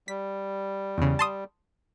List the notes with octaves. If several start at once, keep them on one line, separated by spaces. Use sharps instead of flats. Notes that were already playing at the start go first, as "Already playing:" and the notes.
G3 B6
E2 C#3
A5 C6 D#6